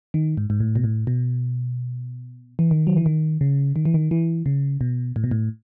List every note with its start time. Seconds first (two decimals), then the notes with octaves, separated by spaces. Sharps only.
0.14 D#3
0.37 G#2
0.50 G#2
0.60 A2
0.76 B2
0.84 A2
1.07 B2
2.59 E3
2.71 D#3
2.87 F#3
2.97 E3
3.06 D#3
3.41 C#3
3.76 D#3
3.85 E3
3.94 D#3
4.11 E3
4.46 C#3
4.81 B2
5.16 A2
5.24 B2
5.31 A2